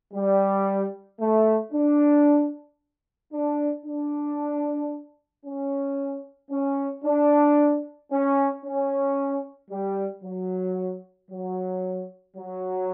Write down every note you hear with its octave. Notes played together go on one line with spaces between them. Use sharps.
G3
A3
D4
D4
D4
C#4
C#4
D4
C#4
C#4
G3
F#3
F#3
F#3